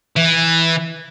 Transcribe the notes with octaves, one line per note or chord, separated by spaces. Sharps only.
E3